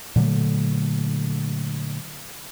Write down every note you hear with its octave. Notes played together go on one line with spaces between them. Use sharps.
A#2 D3 F#3 A3